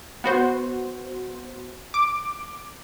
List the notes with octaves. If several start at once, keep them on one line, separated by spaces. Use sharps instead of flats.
B3 F#4 C5
D6